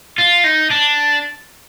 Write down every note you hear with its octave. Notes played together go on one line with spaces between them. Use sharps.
F4
D#4
D4